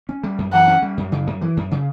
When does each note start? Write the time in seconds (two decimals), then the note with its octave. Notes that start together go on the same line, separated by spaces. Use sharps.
0.09 C#4
0.23 G3
0.38 F#2
0.53 E3 F#5
0.68 C#4
0.82 G3
0.97 F#2
1.12 C#3
1.27 F#2
1.41 E3
1.57 F#2
1.71 C#3